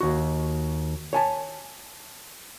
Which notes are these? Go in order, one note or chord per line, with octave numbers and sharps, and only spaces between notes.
D#2 F#4
C#5 G#5 A5